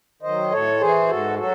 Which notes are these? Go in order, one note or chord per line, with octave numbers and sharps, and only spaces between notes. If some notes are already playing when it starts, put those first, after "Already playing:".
D#3 F#3 C5 D#5
A2 A4 C#5
E3 G#4 C5
G#2 F#4 A4
F#3 F#4 A4